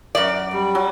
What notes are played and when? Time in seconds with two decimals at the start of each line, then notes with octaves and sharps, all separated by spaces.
0.15 F#2 D5
0.53 G3
0.75 F#3